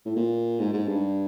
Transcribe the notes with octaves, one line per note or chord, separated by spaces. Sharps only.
A2
A#2
G#2
G#2
G2